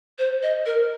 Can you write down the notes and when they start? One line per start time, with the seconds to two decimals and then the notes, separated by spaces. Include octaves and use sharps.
0.19 C5
0.43 D#5
0.66 A#4